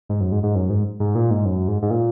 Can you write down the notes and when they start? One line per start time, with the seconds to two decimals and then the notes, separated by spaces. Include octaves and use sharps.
0.09 G#2
0.21 F#2
0.32 G#2
0.43 G#2
0.55 F#2
0.70 G#2
1.00 G#2
1.15 A#2
1.30 G#2
1.45 F#2
1.68 G#2
1.82 G#2
1.90 A#2